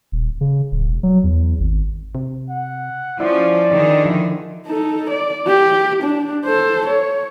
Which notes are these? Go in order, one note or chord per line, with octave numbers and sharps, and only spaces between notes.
D#1
C#3
D1
E1
F#3
E2
G#1
C3
F#5
F3 C#4 E4 D5
D3 D#3 G#4
F3 E4
D#4 A4
D5
G4
D4
A4 C5
C#5